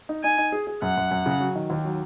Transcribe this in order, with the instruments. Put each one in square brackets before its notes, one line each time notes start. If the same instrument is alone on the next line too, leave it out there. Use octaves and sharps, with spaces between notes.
[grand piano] D#4
[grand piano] D#4 [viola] G#5
[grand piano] D#4
G#4
G#4
[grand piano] F#2 [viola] F#5
[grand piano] F#2
F#2
C#3
F#3
D#3
D#2
F#3